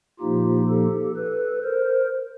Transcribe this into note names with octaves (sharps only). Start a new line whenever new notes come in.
A#2 F3 A#3 D#4 F4 G4
G4 A4
A4 B4
A#4 C5